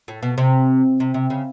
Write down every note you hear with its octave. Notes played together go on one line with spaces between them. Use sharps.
A2
B2
C3
C3
C3
C#3